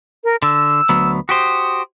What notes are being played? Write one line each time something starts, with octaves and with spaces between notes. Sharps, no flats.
A#4
D3 E6
D2 F#3 B3
F#4 G4 C5 D#6